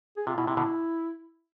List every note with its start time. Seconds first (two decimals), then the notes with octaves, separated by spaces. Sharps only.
0.17 G#4
0.27 C3 F4
0.37 B2 E4
0.47 C3 E4
0.57 B2 D3